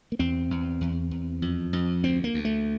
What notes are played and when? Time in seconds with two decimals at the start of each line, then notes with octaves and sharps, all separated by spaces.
0.12 A#3
0.19 E2 C4
0.50 E2
0.81 E2
1.11 E2
1.42 F2
1.73 F2
2.03 D2 C4
2.24 A#3
2.34 D2
2.45 A3